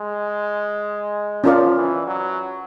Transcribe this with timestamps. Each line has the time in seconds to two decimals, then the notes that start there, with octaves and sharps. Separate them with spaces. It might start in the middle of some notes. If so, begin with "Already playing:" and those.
Already playing: G#3
1.44 F3 C#4 F4 A#4 D5 F5
1.76 E3
2.07 F#3